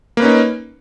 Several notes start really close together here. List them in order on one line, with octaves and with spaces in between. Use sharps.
A#3 B4 C#4 D#4